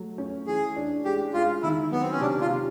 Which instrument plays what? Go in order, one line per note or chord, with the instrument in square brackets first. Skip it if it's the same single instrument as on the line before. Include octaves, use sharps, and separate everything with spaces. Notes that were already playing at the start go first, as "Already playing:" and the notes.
Already playing: [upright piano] F#3 A3
C#4
[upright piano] E3 [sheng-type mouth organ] G#4
[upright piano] D4
[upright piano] G#3 [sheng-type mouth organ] G4
[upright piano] G#3 [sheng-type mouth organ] F4
[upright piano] D#3 [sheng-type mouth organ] E4
[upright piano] F#3 [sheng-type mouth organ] B3
[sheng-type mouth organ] C4
C#4
[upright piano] C3 [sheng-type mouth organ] D4
[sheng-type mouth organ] F4
[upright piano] C3